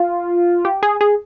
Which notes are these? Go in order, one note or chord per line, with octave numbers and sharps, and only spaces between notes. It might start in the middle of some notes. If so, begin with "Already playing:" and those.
Already playing: F4
G4
G#4
G#4